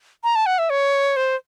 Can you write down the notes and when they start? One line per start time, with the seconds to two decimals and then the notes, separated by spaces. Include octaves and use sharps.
0.24 A#5
0.35 A5
0.46 F#5
0.59 E5
0.70 C#5
1.16 C5